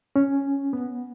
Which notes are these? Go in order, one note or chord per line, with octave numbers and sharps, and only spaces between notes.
C#4
B3